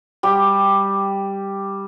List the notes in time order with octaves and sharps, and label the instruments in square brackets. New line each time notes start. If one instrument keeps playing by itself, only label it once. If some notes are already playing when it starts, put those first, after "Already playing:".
[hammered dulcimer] G3 G4